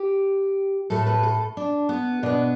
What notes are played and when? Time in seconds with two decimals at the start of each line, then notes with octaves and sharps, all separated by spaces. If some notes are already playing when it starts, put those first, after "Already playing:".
Already playing: G4
0.90 A2 A3 A4
1.06 B4
1.23 A4
1.57 D4
1.89 B3
2.23 B2 B3 D4